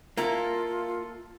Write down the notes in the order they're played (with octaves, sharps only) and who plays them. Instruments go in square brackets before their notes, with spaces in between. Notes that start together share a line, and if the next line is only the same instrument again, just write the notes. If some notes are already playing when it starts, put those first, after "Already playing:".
[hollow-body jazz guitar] A#3 E4 [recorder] F4 [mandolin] A4 A#5